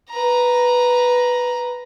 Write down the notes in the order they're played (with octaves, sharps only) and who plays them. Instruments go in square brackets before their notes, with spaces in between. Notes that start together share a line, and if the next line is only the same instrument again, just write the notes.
[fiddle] B4 A#5